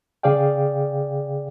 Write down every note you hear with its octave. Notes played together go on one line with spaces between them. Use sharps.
C#3 G#4 D5 F5 G5